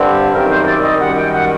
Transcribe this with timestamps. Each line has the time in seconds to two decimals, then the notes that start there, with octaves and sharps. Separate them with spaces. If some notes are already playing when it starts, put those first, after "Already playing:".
Already playing: G2 D3 G3 C4
0.34 F#2 D#3 G3 C4 A#4
0.50 C5
0.67 D5
0.83 D#5
1.00 F#2 D#3 G3 F#5
1.17 G5
1.33 F#5